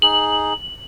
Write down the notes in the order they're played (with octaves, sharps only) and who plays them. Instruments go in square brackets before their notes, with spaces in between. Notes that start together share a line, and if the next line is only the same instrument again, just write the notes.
[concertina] D#4 G#4 [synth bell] F#7